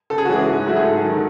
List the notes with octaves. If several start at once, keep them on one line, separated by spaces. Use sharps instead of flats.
C#3 A4
G#4
F#4
E3 G#3 C#4 G#4
G#2
F#3 A3 E4 F#4
G#4
G#2 A4
D#3 F#3